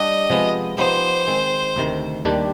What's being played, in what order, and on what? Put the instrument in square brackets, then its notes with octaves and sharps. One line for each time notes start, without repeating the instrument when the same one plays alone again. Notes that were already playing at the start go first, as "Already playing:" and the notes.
Already playing: [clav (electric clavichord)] G3 D4 G4 D5 [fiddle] D#5
[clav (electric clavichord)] C3 F3 G#3 B3
[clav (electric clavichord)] F3 B3 D#4 G4 [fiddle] C5
[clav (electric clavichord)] D#3 G#3 C4
D2 C3 D#3
D#2 D#3 G3 D4 G4